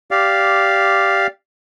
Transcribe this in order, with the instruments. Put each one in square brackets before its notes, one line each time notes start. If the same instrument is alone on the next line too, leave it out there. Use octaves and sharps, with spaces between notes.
[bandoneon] G4 D5 F5